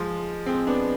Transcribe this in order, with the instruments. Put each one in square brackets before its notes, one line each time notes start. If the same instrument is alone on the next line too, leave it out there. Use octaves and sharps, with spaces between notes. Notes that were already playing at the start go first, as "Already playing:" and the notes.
Already playing: [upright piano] F3 G#3
G#3 C4
B3 D4